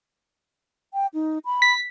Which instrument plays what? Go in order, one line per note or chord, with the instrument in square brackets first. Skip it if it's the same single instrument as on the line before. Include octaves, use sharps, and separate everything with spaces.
[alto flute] G5
D#4
B5
[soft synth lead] B6